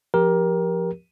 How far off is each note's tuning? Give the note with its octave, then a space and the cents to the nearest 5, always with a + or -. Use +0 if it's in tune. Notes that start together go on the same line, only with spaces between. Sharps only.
F3 +5 G4 +0 A#4 +20